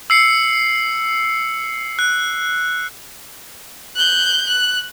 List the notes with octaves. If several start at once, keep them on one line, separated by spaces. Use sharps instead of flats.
E6 C7 C#7
F#6
F#6 G6
F#6